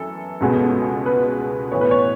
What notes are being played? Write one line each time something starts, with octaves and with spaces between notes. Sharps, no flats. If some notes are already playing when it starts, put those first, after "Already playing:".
Already playing: F#2 E3 A4
C#2 B2 G#3 B3
B4
A2 E3 B3 C#5
B4
C#5